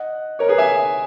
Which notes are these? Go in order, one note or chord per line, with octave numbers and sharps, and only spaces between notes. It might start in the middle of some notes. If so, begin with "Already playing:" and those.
Already playing: D#5 F#5
A#4 C#5
G#4 B4
E5 G#5